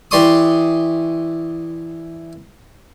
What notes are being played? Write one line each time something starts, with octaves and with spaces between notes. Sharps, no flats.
E3 G4 D5 C6 C#6 D#6